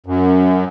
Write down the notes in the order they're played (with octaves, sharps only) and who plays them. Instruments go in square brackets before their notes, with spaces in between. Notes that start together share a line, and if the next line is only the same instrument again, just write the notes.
[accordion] F#2